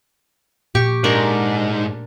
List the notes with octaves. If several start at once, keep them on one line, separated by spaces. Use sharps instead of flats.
A#2 G4 C#6
G#2 D4 A#4 C#6